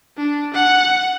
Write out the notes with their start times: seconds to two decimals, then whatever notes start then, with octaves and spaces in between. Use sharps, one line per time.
0.17 D4
0.53 F#5